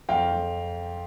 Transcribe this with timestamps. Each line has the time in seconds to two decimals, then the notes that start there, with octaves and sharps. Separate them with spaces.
0.09 F2 F5 G5
0.32 F2